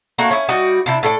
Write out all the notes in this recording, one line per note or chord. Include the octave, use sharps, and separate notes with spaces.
A3 A#3 D4 F#4
C#4 E4
G3 D#4 F#4 D5
C3 D4 E4
A2 A4 D5